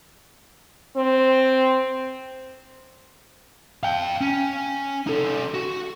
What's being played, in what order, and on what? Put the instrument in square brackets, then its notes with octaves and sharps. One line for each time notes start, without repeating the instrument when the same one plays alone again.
[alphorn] C4
[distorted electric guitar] F5 G5
C#4
D#4 A4
F#4